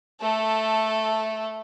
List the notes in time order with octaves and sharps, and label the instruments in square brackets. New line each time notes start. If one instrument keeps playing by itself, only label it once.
[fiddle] A3 A4